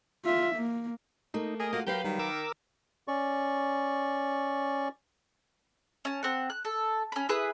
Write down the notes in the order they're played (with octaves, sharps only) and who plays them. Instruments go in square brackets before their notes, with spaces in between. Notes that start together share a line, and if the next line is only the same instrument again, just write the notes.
[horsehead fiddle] F4 E5
A#3
[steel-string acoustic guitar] A3 A#3 [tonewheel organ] D#4
[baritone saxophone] G#4 [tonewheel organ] A#4 D#5
[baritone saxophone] A#3 [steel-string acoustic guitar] F4 F#4
[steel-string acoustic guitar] F#3 B4 F5 [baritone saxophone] G4 [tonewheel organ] A#4 G6
[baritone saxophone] D#3 [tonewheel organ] G3
[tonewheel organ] A#4 D6 E6
[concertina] C#4 D5 C#6
[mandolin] C#4 A5
C4 F#5
F#6
A4
C#4 B5
E4 G#4 B4